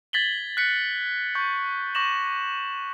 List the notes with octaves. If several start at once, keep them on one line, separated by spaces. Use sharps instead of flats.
G#6 A6 B6 F#7 G7
F#6 B6 C#7
C#6 G6
C#6 D6 A#6 E7 F#7